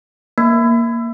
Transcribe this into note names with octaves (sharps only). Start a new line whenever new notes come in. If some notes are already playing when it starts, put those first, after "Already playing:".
A#3